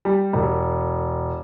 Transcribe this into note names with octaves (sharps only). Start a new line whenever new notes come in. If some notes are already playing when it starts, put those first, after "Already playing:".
G3
E1